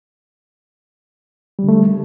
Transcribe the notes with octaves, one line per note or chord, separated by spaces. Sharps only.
D3 G3 A3